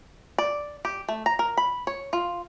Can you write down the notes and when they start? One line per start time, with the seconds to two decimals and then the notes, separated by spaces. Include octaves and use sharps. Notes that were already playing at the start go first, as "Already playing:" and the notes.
0.38 D5
0.85 G4
1.08 A3
1.26 A#5
1.39 A#4
1.57 B5
1.87 C#5
2.13 F4